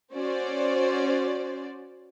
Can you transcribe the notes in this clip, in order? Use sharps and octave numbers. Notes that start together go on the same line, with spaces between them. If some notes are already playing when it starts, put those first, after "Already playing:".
C#4 F#4 C5 D5